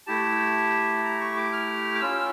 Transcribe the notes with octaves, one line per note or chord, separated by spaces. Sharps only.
A3 E4 G4 A5
A#5
C#6
D6
F6
D6
C#4 F4 E6